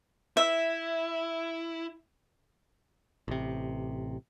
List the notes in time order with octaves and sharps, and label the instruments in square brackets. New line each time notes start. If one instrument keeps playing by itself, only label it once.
[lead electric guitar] E4 [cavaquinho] E5
[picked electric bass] A1 C3